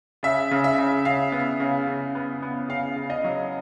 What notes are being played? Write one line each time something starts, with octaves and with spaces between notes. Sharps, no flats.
C#3 E5
C#3
E5
C#3
C#3 F5
B3
C#3
C#3
B3
B3
C#3 F5
C#3
D#5
F#3